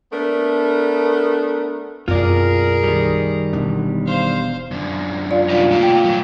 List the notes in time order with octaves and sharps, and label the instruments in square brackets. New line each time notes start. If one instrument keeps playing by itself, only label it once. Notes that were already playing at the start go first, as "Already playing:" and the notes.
[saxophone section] A3 B3 D4 A#4
[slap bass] B1 C4 [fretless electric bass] F#2 F#3 [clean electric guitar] F4 D5 [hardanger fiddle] G#4 A#4
[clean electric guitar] D#3 G3
[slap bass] E1 B2 D4
[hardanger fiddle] C5 F5
[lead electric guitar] F#2 D3
[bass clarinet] F4 [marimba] D5
[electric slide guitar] C3 G3 D#4 [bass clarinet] F4
[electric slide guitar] A2 A#3 F5
[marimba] G5
[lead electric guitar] F#3